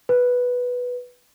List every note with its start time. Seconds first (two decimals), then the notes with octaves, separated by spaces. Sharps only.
0.09 B4